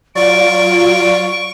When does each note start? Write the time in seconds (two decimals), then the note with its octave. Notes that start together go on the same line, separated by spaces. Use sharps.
0.15 F#3 F4 D5 C#6 D7